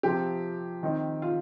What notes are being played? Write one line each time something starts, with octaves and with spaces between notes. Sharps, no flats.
C3 F3 C4 F4 G4
D#3 C4 D#4
F4